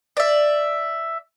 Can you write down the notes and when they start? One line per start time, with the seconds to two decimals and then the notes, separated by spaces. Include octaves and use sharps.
0.17 D5 E5